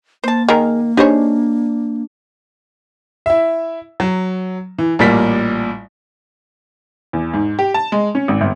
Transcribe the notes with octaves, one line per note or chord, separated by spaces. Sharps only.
A#3 C5 A5
D#3 G#4 A#4
D4 D#4 G4 G#4 C5 C#5
E4 E5
F#3
E3
A1 A#2 G3 A#3 B6
E2
G#2
G4
A5
G#3
C#4
G#1
G1